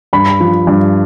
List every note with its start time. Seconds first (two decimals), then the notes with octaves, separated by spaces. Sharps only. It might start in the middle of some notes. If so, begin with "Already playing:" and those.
0.13 G2 B5
0.40 F3
0.67 G2